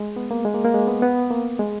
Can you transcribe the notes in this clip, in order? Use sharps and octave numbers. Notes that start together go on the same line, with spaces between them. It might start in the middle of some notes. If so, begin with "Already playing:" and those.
Already playing: G#3
B3
A#3
G#3
A#3
A#3
G#3
B3
B3
A#3
G#3